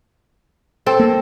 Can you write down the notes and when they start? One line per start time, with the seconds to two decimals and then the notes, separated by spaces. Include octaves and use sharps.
0.86 C4 A4
0.99 A#3